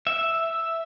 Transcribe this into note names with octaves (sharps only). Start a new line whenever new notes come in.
E5